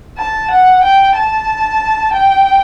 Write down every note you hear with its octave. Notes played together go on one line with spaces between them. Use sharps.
A5
F#5
G5
A5
G5